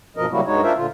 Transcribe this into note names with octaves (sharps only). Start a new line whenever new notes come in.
G2 B2 F3 A#4 D#5
C#3 F#3 G3 A#3 E4 F#4
G2 G#3 D#4 F#4 C#5
D4 F4 A#4 C5 E5
A#2 D3 F4